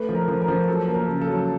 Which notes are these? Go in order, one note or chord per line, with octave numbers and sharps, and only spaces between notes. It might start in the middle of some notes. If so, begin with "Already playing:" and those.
Already playing: A3 B4
F3
A#4
F3
A#4
F3
F#3 A4
A#3
A#4
C#3
A4
F#3